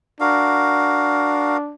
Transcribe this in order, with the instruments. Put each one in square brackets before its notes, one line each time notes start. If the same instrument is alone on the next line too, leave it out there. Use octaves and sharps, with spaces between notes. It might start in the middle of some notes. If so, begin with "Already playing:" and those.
[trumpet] D4 [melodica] F#4 A#4 F5